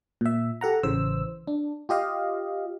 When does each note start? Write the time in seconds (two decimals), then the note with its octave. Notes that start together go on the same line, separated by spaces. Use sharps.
0.21 A#2 E5
0.61 G4 A4 F#5 A#5
0.83 A1 C#3 E3 C5 E6
1.47 D4
1.89 F4 G4 D#5 F5